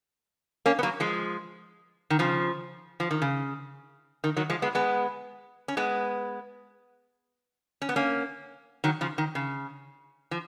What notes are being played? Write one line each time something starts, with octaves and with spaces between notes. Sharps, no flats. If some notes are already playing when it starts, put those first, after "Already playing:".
A#3 C#4
B3
F#3 A#3
F3 G#3
D#3
C#3 F3
F3
D#3
C#3
D#3
D#3 F#3
F3 G#3
G#3 B3
G#3 B3
C#4
G#3 B3
C#4
B3
A#3 C#4
D#3 F#3
C#3 F3
D#3
C#3
F3